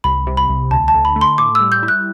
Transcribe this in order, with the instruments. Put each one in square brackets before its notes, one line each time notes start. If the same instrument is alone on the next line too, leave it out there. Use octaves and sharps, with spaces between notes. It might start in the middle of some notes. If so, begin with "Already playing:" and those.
[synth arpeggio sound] C2 [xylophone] B5
[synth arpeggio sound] C3
[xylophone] B5
[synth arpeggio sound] C2
[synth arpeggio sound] D2 [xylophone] A5
[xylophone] A5
[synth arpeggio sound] D3
[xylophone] B5
[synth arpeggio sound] A3
[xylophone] C6
[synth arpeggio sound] A2 [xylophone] D6
[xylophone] E6
[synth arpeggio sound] G3
[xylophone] G6
[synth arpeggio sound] E4
[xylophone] F#6